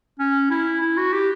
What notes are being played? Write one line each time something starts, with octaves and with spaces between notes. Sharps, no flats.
C#4
E4
E4
F#4
G4